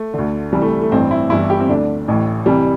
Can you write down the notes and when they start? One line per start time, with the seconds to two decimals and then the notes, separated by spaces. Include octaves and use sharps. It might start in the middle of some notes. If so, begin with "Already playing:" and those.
Already playing: A3
0.14 D2 D3
0.52 C2 C3 E3 G3
0.62 A3
0.82 A3
0.92 A1 G2 E3 C4
1.11 E4
1.30 G1 G2 E3 E4
1.50 G4
1.60 C4
1.68 D2 D3 D4
2.08 A1 A2 E3
2.46 C2 C3 E3 G3